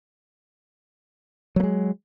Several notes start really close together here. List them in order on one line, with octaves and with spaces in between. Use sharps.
F#3 A#3 G#3